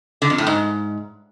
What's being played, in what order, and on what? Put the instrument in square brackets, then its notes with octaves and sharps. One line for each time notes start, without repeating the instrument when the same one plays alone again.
[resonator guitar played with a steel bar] D3
F2
A2
G#2